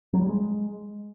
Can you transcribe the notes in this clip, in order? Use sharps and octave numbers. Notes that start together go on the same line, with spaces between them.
F#3
G3
G#3